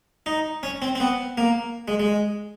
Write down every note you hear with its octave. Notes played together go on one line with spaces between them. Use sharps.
D#4
C#4
C4
C4
B3
A#3
G#3
G#3